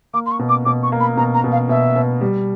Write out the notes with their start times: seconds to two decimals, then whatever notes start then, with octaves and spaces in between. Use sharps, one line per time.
0.14 A#3 D6
0.26 C6
0.31 C#6
0.39 B2
0.49 D6
0.65 B2 D6
0.83 C#6
0.92 A#3
1.00 B5
1.17 B2 A#5
1.34 A#5
1.44 B2
1.52 F5
1.69 B2 E5
1.96 B2
2.21 G3